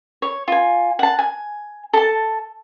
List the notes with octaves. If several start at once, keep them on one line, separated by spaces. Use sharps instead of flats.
C#5
F4 G#5
F#5 A5
G#5
A4 A5